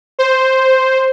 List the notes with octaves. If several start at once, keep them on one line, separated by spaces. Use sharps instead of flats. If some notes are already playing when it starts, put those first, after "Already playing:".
C5